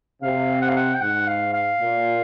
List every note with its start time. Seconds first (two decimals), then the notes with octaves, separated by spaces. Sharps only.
0.22 C3 F5
0.62 F#5
0.68 F5
0.76 F#5
0.95 G5
1.01 G#2 F#5
1.27 F5
1.53 F5
1.79 A#2